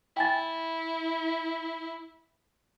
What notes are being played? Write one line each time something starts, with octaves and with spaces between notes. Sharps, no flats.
E4 G5 G#5 A6